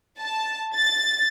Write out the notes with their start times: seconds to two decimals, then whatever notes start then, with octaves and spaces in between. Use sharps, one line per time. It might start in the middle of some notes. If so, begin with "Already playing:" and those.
0.20 A5
0.75 A6